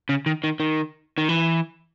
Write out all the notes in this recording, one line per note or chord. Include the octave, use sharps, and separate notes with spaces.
C#3
D#3
D#3
D#3
D#3
E3